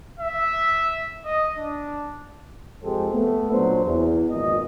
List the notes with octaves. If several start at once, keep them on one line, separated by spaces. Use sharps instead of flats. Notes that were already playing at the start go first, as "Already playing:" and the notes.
E5
D#5
D4
F2 G#3 G4 A4 C5
A3 B3
A#2 F#3 D4 C5
E2
G#1 A#2 F3 B3 D#5